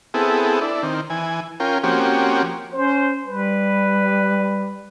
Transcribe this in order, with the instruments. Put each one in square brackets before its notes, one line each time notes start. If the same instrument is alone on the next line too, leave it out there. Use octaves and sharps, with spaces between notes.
[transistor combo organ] B3 C4 E4 G#4 A4
D4 E4
D#3 C4
E3 G#5
C#4 F4 A#4 G5
F3 A#3 C4 C#4 F#4 G4
[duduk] C#4 [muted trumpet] C5
[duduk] G3 [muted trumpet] B4